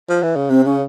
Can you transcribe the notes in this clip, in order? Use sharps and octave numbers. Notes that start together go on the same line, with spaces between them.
F3
E3
C#3
C3 C4
C#3 C#4